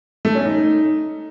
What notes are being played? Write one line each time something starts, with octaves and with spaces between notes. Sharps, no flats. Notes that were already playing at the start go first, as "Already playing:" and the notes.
A3
C#4
D#4